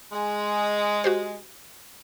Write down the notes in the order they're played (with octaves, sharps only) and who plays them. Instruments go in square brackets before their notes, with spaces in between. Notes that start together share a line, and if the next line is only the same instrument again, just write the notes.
[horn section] G#3
[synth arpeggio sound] F#4 G4 C5